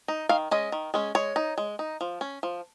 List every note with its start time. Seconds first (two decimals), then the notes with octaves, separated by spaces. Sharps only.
0.08 D#4
0.29 D#3 F5
0.51 G#3 C#4 D#5
0.72 D#3
0.94 G#3 C#4
1.15 G#3 C#5
1.36 D#4
1.58 G#3
1.79 D#4
2.01 F3
2.21 C#4
2.43 F3